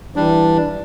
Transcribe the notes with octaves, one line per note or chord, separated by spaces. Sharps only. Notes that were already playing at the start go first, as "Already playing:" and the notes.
E3 G3 D4